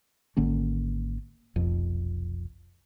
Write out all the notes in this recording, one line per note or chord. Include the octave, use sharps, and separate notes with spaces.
G#1 D3 A#3 C#4
F1 B1 F2